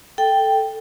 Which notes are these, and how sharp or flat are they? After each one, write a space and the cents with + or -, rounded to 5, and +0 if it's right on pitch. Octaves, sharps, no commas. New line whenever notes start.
A4 +0 G5 +0